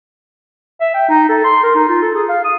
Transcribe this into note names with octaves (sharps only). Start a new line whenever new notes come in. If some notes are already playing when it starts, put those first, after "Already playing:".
E5
G5
D#4
A4
C6
A#4
D#4
F4
A4
G#4
F5
D#6